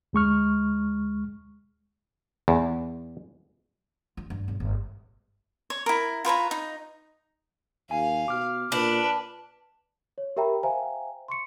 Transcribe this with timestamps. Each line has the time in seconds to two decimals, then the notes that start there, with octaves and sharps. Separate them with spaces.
0.13 D2 G#3 C#6 F6
2.48 E2
4.17 F4
4.30 G2
4.48 B1
4.60 G1
5.70 C#5
5.86 E4 A#4
6.25 F4 B4 C#5 A#5
6.51 D#4
7.91 D#2 F5 G#5
8.28 B2 D6 F6
8.72 A#2 D4 B4
10.18 C#5
10.37 G4 A#4 E5 G5 A#5 B5
10.63 C5 E5 F5 G5 G#5 A#5
11.28 C6 C#6 C#7